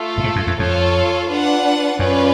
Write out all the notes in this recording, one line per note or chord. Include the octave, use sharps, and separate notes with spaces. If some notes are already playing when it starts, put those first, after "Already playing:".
Already playing: A3 F4 A4
A2
G#2
F#2
F2
F2 F4 A4 C#5
D4 F4 B4 F#5
F#2 C#4 F4 B4 D5